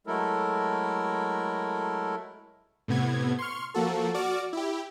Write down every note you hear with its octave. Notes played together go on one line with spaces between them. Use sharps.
F#3 G#3 A3 E4 A4 A#4
A2 C3 B3 G#6
C6 C#6 F6
F3 A#3 F#4 A4
F#4 D5 D6 F6
E4 G4